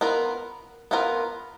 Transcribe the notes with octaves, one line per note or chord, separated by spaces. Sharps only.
B3 F4 A#4
B3 F4 A#4